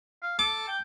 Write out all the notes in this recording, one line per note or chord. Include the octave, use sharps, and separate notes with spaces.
F5
A4 D6
G5